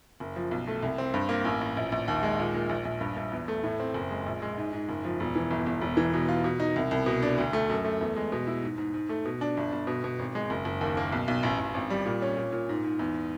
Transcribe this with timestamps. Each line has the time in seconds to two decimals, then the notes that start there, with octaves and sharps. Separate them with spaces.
0.20 F#1
0.36 F3
0.51 B1
0.68 A3
0.83 C2
0.98 C4
1.14 G2
1.29 A#3
1.45 A1
1.61 A1
1.77 A#1
1.92 A#1
2.08 D#2
2.23 G#3
2.39 A#2
2.54 A#2
2.69 A#1
2.85 A#1
3.01 G2
3.17 G2
3.32 E2
3.48 A3
3.64 A2
3.80 C4
3.94 F#1
4.11 G#3
4.26 A#1
4.42 G#3
4.57 G#2
4.73 G#2
4.89 F#1
5.04 F3
5.20 E1
5.35 E3
5.50 G1
5.66 G1
5.81 E1
5.97 E3
6.14 B2
6.28 F4
6.44 B2
6.60 D#4
6.76 C2
6.91 C2
7.06 B2
7.22 D4
7.38 D2
7.53 A3
7.70 F#2
7.85 A3
8.01 E2
8.16 G#3
8.32 B2
8.47 E4
8.63 G#2
8.78 G#2
8.94 G#2
9.09 A3
9.25 B2
9.41 D4
9.57 G1
9.72 G1
9.87 B2
10.04 B2
10.19 G#1
10.35 G#3
10.50 F#1
10.65 F#1
10.81 D#2
10.97 A#3
11.13 B1
11.28 B1
11.43 A1
11.59 A1
11.74 G#1
11.90 G3
12.06 A#2
12.22 C#4
12.37 A#2
12.52 A#2
12.69 G#2
12.84 G#2
12.99 E2